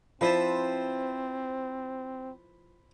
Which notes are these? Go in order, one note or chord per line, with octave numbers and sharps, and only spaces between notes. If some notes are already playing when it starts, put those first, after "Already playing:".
F3 C4 E4 B4 C5 E5 A5